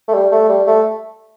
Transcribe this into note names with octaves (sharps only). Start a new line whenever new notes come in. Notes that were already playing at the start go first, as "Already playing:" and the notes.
A3
G3
A3
G3
A3